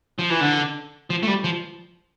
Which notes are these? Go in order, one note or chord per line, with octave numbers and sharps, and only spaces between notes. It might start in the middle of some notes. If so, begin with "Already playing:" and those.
F3
E3
D3
F3
A3
G3
F3